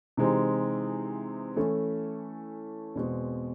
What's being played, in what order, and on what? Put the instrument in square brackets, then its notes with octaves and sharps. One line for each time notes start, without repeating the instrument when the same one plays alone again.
[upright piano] C3 E3 G#3 C4 D#4
E3 A3 C#4 E4 A4
E2 B2 G#3 C4